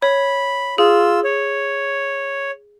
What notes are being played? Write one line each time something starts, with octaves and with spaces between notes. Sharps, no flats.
C#5 B5
F4 G#4 E6
C#5